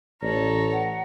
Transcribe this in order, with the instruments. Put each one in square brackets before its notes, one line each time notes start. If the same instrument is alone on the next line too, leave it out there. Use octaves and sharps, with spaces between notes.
[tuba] A1 [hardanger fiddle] A4 C#5 [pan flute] D5 [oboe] A#5
[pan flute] F#5